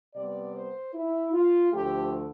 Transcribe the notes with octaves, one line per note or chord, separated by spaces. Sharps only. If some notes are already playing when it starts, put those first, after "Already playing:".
C3 G3 B3 D5
C5
E4
F4
D2 D3 F3 A3 G4